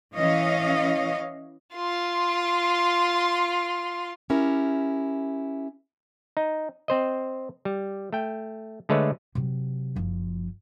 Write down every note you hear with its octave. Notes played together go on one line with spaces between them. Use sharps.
E3 C#4 C#5 D#5 F5
F4 C6
C#4 E4 G4 A#4
D#4
C4 C5 D#5
G3
A3 G5
D3 G#3 A3 B4 C#5
C3 F#3
F#1 F3